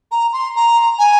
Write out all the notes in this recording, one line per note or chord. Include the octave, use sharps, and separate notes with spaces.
A#5
C6
A#5
G#5